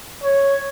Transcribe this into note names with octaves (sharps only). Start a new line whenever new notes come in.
C#5